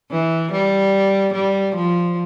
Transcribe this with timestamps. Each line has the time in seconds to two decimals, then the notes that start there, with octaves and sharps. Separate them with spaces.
0.11 E3
0.52 G3
1.34 G3
1.75 F3